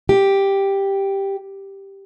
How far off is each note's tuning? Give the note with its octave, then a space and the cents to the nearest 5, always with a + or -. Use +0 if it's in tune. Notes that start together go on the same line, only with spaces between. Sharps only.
G4 +0